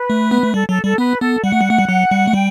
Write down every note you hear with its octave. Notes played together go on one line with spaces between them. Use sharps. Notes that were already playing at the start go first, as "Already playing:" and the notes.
Already playing: B4
A3
B3
A3
G3 A4
F#3 A4
G3 A4
B3 B4
B3 A4
G3 F#5
A3
G3
A3
G3
F#3
G3
A3
G3 G5